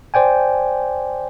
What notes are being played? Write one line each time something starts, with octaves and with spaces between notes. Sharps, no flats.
C5 D5 G5 G#5